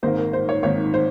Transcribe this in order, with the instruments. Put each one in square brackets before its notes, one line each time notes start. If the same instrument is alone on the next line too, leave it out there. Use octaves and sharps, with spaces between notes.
[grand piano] G#1 G#2 D#3 A#3 C5
A#4
C5
C#5
G#1 G#2 D#3 A#3 C#5
C5